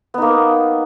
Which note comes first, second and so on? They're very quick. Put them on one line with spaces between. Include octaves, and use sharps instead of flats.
B3 D#4 A#3